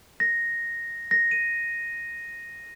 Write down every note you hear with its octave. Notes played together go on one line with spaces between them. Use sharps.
A#6
A#6
D#7